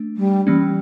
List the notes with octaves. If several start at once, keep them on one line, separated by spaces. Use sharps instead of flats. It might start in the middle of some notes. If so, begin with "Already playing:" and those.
Already playing: A3 D4
G3
E3 G3 A#3 C#4